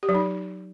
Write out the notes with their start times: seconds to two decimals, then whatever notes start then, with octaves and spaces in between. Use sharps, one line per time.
0.03 G4
0.09 F#3
0.15 D#4